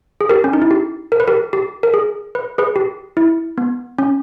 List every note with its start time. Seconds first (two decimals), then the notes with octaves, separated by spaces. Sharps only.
0.21 G#4
0.29 G4 A#4
0.44 C#4
0.53 D#4
0.62 E4
0.71 G4
1.12 A#4
1.20 B4
1.28 G4 A#4
1.53 G4
1.83 A#4
1.94 G#4
2.35 B4
2.58 G#4 B4
2.76 G4
3.17 E4
3.58 B3
3.99 C#4